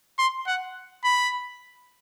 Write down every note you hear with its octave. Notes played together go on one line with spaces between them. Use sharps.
C6
F#5
B5